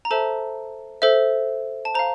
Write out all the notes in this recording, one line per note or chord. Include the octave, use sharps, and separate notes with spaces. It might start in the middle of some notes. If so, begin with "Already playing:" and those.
A#5
A4 C5 E5 A5
A4 C5 E5
A5
C5 F5 A#5